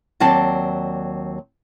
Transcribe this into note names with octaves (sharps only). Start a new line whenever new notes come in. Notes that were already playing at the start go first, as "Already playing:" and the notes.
D#2 F#3 C4 D5 A5